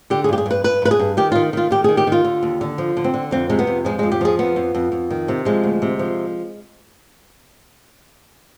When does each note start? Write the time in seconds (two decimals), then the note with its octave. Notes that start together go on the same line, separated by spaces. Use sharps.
0.10 D3 G4
0.24 G#4
0.29 G2 G4
0.38 G#4
0.46 G2 B4
0.64 G2 B4
0.82 G2 B4
0.91 G#4
0.99 G2
1.17 D#3 G4
1.32 D#3 F4
1.53 D#3 F4
1.71 D#3 G4
1.84 D#3 G#4
1.97 G4
2.07 D#3 F4
2.25 D3
2.43 D#2
2.61 D3
2.78 F3
2.97 D3
3.04 C4
3.14 D3
3.31 F2 C4
3.49 C3 G#3
3.59 B3
3.67 F2
3.85 F3 G#3
3.99 F2 G#3
4.12 G4
4.21 F3 G#4
4.39 F2 B3
4.56 F2
4.75 F2
4.92 F2
5.10 D#3
5.28 C3
5.45 F3 G#3
5.63 D2
5.82 C3
5.99 F3